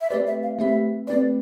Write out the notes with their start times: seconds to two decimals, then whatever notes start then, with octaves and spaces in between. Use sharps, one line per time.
0.01 E5
0.10 A3 C4 G4 B4 D5
0.27 E5
0.43 F5
0.59 A3 C4 G4 B4 E5
1.07 A3 C4 G4 B4 D5